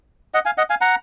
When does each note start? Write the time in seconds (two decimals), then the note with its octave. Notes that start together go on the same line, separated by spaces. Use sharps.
0.34 D#5 F#5
0.45 F5 G#5
0.58 D#5 F#5
0.70 F5 G#5
0.81 F#5 A#5